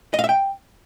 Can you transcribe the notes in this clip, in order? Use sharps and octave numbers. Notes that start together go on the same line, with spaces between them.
D#5
F5
E5
G5